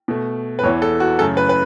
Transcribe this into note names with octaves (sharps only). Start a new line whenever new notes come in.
B2 A3
B4
E2 E3 B3 C#5
A4
F#4
F#2 C#3 A3 A4
B4
B4